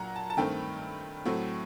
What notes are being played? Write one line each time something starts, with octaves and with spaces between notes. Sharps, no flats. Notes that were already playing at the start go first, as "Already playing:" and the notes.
Already playing: A#2 F#3 F#5 A#5
A5
A5
G2 D#3 A3 C4 G5
A2 F#3 A3 C4